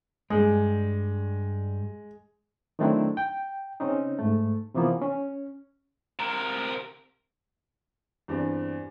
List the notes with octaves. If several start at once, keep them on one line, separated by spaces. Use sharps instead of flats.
G2 G3 G#3
D#3 F#3 A3 C4 D4 E4
G5
C#3 C4 C#4 D#4
G#2 A3
C3 E3 F3 A#3 B3
C#4
C3 A#4
E2 G2 C4 D4